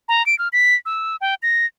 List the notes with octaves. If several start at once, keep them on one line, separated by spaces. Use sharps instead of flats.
A#5
D7
F6
B6
E6
G5
A#6